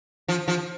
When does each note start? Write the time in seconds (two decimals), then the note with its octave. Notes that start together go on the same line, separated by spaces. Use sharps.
0.28 F3
0.48 F3